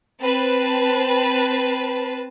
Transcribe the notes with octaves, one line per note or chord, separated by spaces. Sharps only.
C4 B4 A5